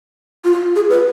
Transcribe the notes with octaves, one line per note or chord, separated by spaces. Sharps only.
F4
G#4
B4